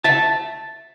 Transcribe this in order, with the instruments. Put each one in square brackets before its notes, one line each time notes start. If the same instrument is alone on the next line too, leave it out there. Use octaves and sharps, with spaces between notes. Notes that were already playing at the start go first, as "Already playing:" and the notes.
[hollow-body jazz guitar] E5 A5